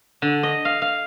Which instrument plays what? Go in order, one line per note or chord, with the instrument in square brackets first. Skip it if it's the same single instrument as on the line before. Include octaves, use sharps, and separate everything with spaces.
[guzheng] D3
D#5
F5
F5